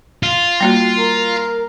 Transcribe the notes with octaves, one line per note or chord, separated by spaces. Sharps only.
F4
G3 A#3 F#4
A#4